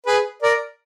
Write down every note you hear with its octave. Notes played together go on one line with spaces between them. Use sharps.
G#4 B4
A#4 D5